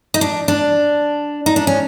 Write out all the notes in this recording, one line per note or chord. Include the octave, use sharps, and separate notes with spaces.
D#4
D4
D4
D#4
D4
C#4